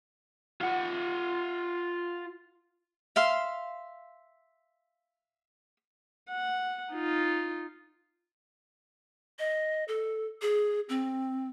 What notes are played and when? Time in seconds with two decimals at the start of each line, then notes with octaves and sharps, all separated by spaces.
0.61 F4 F#5
3.16 E5 F5 C6
6.29 F#5
6.92 D#4 F4
9.39 D#5
9.88 A4
10.42 G#4
10.89 C4